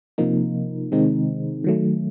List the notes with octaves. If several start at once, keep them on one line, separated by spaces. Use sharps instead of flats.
C3 F3 A#3 D#4
C3 D#3 G#3 C4 D#4
D#3 F#3 A3